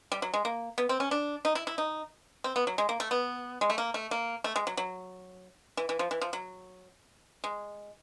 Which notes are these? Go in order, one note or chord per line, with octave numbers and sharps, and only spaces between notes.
G3
F#3
G#3
A#3
B3
C4
C#4
D4
D#4
E4
E4
D#4
C4
B3
F#3
G#3
A#3
A3
B3
G#3
A3
A#3
A3
A#3
A3
G#3
F#3
F#3
E3
E3
F3
E3
F3
F#3
G#3